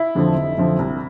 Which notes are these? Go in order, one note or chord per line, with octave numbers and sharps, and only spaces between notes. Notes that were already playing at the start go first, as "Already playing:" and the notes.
Already playing: E4
F2 D3 F3
F1
F2 D3 F3
C2